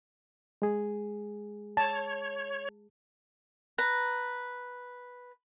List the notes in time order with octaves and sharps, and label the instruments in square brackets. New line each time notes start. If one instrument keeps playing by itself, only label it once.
[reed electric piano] G#3 G#4
[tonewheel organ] C#5 [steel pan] A5
[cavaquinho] B4 A#5